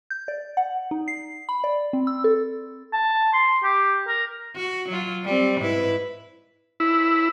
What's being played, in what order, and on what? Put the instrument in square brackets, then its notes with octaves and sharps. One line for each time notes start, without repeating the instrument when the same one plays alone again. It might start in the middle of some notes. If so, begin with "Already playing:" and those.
[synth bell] G6
D5
F#5
D#4
C7
B5
D5
C4
E6
A4
[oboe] A5
C6
G4
A#4
[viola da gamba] F#4
F#3 F4
G3 C4
G#2 E4 B4
[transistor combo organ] E4